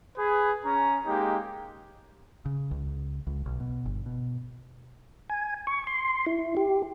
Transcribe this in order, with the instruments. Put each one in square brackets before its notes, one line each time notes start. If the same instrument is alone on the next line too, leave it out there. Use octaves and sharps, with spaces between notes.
[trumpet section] G#4 B4
C#4 A#5
G#3 A#3 D#4 G4
[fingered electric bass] C#3
C#2
C#2
B1
B2
G1
B2
[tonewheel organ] G#5
C#6
C6
E4
G4